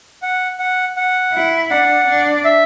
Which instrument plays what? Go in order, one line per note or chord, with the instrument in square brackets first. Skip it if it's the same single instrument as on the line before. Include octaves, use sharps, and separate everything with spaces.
[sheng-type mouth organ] F#5
F#5
F#5
[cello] E4
[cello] D4 [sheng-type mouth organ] F#5
[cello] D4
[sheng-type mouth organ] E5